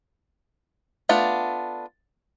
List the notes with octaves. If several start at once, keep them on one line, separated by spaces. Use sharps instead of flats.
A3 B3 D4 F4